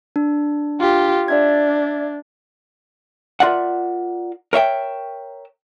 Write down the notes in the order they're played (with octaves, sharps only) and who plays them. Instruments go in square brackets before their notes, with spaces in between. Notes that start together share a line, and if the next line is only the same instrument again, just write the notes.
[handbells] D4
[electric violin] F4 G4
[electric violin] D4 [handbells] D5 E5 G#6
[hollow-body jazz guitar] F4 A#4 D5 E5 F#5
A#4 C#5 E5 G5